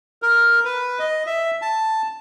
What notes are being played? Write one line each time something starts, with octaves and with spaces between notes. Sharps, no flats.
A#4
B4
D#5
E5
A5